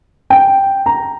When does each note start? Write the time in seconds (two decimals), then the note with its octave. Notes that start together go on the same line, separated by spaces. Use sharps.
0.30 G5
0.86 A#5